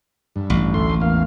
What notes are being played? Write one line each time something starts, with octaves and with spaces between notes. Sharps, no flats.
G2
A1
D2 A3 C6
E2 A#3 F5